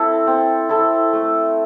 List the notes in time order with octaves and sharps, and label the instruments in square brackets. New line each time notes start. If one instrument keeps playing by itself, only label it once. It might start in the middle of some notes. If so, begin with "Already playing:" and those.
Already playing: [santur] C4 E4 A4
C4
E4 A4
A3